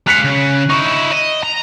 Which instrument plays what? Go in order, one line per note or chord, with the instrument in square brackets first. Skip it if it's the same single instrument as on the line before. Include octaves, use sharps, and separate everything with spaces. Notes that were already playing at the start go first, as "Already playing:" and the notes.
[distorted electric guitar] G#3 F5 [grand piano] F#6 B6 C#7
[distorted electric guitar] C#3
[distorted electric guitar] D#4 E4 [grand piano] C#6
[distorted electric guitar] D#5
A#5